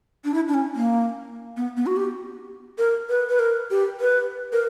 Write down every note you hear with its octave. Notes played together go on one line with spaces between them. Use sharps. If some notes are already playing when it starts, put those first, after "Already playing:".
D4
E4
D4
C#4
A#3
B3
B3
F#4
G4
A#4
B4
B4
A#4
G4
B4
A#4